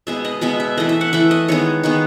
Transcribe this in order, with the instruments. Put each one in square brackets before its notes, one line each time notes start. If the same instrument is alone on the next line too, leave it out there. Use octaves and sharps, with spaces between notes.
[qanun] B2 G#3 B3 E5
D#5
B2 G#3 B3 E5
E5
E3 A3 D#5
E5
F#5
E3 A3 E5
D#5
D#3 G#3 B3 C#5
D#3 G#3 B3